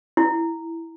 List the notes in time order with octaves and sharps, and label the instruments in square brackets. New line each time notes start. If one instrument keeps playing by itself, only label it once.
[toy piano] E4